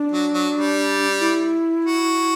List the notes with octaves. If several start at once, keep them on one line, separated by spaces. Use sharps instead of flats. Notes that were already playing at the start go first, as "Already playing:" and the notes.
Already playing: D4
F#3
F#3
G3
E4
F#4